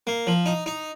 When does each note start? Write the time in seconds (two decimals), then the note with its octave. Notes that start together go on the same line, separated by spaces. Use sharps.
0.07 A#3
0.27 F3
0.46 D#4
0.66 D#4